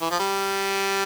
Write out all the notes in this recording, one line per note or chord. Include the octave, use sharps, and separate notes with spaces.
E3
F3
G3